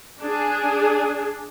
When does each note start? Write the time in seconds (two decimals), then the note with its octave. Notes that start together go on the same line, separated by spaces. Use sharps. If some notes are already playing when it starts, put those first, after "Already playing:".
0.20 D4 G#4